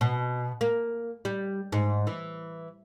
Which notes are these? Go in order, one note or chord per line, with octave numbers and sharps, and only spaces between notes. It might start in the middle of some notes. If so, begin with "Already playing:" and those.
B2
A#3
G3
G#2
E3